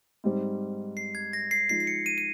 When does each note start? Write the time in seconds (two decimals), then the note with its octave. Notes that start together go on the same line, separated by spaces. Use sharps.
0.24 G#2 G3 C4
0.97 C7
1.15 G#6
1.33 A#6
1.51 C7
1.69 F3 G#3 D#4 C7
1.80 C7
1.87 C#7
2.06 D#7
2.18 D#7